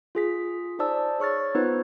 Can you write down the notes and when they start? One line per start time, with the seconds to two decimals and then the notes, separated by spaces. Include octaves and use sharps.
0.15 F4 G#4 B6
0.79 D#4 G#4 C5 D5 A5 E6
1.20 C#5 C#6 F6 A6
1.55 B3 D#4 F4 B4 C5